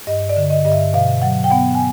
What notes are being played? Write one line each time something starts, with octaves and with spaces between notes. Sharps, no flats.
G2 D#5
D5
D3
D#5
G2 D#5
E5
B2 F5
F#3 F#5
G5
B3 F#5
G#5